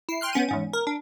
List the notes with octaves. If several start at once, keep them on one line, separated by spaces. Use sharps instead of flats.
E4 C7
G5 C6 F6 F#6
B3 C#4 G5 D#7
E2 G#2 C#4
A#4
D4